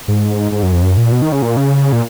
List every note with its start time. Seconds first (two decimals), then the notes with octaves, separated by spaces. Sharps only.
0.08 G#2
0.52 G#2
0.63 F#2
0.73 F2
0.82 F#2
0.97 A#2
1.12 B2
1.22 D#3
1.32 C#3
1.42 A#2
1.57 C#3
1.92 A#2